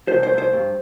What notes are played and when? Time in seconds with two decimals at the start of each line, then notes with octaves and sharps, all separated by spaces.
0.08 C5
0.13 C2
0.23 C5
0.33 C2 C5
0.53 G2